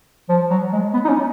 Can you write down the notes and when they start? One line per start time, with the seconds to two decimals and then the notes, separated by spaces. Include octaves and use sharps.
0.29 F3
0.50 F#3
0.72 G#3
0.93 B3
1.04 D#4
1.09 C#4